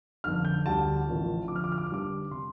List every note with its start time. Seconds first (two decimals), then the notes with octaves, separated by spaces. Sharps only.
0.24 G1 F2 D3 F6
0.45 G6
0.66 D2 D3 G3 D4 A5
1.07 A1 A2 F3
1.48 F2 D3 F3 D6
1.56 F6
1.64 D6
1.72 F6
1.78 D6
1.87 F6
1.90 G1 G2 G3 D4 D6
2.31 C3 C6